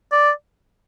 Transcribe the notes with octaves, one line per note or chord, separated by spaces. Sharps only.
D5